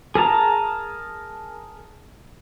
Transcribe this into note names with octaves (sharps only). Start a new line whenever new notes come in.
G#4 A#4 A5 A#5